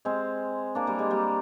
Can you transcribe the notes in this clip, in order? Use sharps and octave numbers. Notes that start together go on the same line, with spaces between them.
G#3 C4
A#3 D4
G3 A#3
G#3
G3 A#3